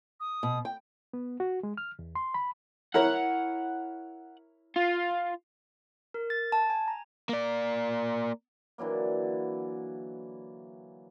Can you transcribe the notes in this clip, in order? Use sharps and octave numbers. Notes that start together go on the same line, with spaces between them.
D#6
B2
G5
B3
F#4
G#3
F6
E2
C6
B5
E4 A#4 C#5 F#5
F4
A#4
A6
A5
G#5
A#5
A#3 D5
D3 E3 F#3 A#3